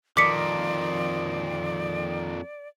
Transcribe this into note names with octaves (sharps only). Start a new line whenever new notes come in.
F2 D#3 F3 A#3 D5 D6 B6 C#7